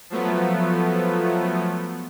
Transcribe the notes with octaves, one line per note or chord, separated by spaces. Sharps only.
F3 F#3 A3 B3